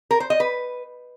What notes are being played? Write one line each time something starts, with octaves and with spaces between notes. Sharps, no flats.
A#4
C5
D#5
B4